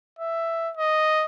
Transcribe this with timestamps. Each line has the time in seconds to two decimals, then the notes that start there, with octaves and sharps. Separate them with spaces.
0.19 E5
0.77 D#5